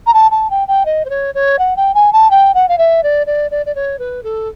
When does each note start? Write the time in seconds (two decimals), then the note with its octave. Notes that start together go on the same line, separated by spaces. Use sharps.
0.07 A#5
0.14 A5
0.31 A5
0.50 G5
0.68 G5
0.86 D#5
1.05 C5
1.10 C#5
1.35 C#5
1.59 F#5
1.77 G5
1.94 G#5
2.13 A5
2.30 G5
2.54 F#5
2.69 F5
2.78 E5
3.03 D5
3.27 D5
3.51 D5
3.66 D5
3.75 C#5
3.99 B4
4.23 A4